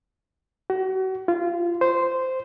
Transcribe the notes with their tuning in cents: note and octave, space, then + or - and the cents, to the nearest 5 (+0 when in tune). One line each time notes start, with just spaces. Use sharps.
F#4 +35
F4 -20
C5 -10